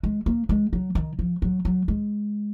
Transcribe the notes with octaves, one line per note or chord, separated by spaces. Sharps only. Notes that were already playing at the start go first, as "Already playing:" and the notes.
G#3
A#3
G#3
F#3
D#3
F3
F#3
F#3
G#3